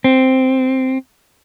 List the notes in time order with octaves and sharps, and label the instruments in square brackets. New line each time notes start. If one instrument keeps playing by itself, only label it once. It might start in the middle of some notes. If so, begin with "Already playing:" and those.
[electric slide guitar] C4